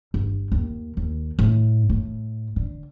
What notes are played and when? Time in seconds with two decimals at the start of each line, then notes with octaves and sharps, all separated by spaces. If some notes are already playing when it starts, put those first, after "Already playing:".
0.14 G1
0.52 D#2
0.97 D#2
1.39 A2
1.89 A2
2.56 D3